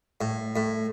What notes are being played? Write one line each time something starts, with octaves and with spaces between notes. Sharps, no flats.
A2
A2